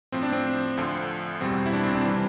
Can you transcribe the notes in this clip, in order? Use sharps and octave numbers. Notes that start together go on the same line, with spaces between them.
A2 F3 C4
D4
C4
D2 D3 F3
E2 B2 G3 C4
E4
D4
C4
D4
C3 E3 G3